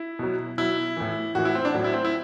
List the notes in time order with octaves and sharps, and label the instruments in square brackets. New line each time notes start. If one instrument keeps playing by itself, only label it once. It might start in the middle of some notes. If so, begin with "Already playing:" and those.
Already playing: [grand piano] E4
B2 F#3
B2 F#3 E4
A2 E3
A2 E3 F#4
E4
C4
D4
A2 F#3
E4
C4
E4